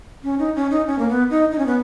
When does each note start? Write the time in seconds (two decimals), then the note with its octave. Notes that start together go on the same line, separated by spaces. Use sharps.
0.24 C#4
0.39 D#4
0.55 C#4
0.71 D#4
0.87 C#4
0.99 A#3
1.09 B3
1.30 D#4
1.51 D#4
1.59 C#4
1.66 B3